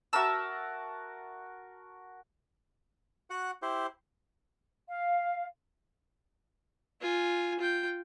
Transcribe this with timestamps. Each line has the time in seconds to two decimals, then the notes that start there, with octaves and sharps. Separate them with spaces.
0.13 F#4 A#4 E5 A5 E6
3.30 F#4 F#5
3.62 E4 G4 C5
4.88 F5
7.01 F4 G#5
7.59 F4 G5